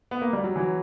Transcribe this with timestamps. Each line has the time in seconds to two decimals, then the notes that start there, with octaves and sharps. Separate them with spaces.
0.11 B3
0.22 A#3
0.33 G3
0.44 F#3
0.56 E3
0.60 F#3